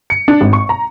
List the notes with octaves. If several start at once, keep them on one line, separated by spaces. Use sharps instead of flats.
C#7
D4
G#1
C#6
A#5